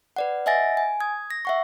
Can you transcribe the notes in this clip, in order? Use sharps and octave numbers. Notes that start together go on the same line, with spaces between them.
B4 D5 F#5
D#5 E5 F#5 G#5 A6 A#6
G#5
D#6 G#6
A#6
E5 F#5 C#6